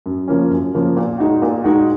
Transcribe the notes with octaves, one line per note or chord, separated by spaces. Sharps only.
F#2
C#3 F3 A#3 C#4
F#2
C#3 F3 A#3 C#4
A#2
G#3 D#4 F#4
A#2
G#3 D#4 F#4